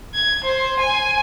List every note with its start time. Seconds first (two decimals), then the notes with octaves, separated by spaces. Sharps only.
0.14 G#6
0.44 C5
0.80 G#5